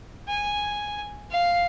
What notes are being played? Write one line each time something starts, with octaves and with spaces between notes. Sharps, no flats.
G#5
F5